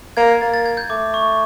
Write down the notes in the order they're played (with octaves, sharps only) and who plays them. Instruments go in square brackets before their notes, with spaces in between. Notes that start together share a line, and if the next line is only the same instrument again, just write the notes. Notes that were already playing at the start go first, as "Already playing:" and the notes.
[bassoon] A#3 [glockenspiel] G#6
[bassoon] A#3 [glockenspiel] A6
[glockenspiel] A6
G#6
G6
[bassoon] A3 [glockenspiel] D6
[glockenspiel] C#6